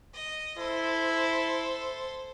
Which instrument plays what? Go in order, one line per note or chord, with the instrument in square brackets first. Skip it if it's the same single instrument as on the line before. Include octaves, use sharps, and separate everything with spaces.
[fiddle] D#5
[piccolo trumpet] E4 [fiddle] A4 C5